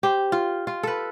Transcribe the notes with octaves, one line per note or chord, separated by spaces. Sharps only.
G4 C5
F4
F4
A4 B4